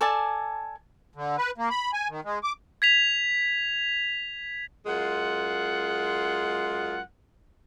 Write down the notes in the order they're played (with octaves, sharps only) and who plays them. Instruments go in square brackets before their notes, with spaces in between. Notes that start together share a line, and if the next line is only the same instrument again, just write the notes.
[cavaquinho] A4 D5 G#5 A5
[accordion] D3
B4
A#3
B5
G#5
D#3
G#3
D6
[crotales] G#6 B6 F7
[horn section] F#2 G#3 F4 F#5